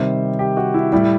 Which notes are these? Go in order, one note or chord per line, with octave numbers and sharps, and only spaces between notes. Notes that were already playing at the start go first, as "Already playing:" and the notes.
Already playing: C3 D#3 G3 C5
G4
F#4
E4
A2 G3 E4